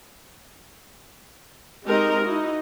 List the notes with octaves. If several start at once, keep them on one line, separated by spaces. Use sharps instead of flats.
G#3 C4 D#4 G4 A#4 D#5
D#4 E4 F#4 D#5